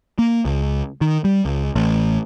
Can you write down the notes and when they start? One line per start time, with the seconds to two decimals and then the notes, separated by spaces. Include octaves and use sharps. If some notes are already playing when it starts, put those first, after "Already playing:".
0.19 A#3
0.45 C#2
1.01 D#3
1.24 G3
1.45 C#2
1.75 A1